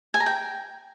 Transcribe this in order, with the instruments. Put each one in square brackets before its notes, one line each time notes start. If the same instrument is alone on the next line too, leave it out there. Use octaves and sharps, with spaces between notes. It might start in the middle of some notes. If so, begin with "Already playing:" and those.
[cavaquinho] G#5
A#5
G5